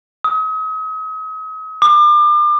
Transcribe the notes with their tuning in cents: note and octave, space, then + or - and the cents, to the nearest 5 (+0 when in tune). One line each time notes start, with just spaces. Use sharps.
D#6 +40
D6 +35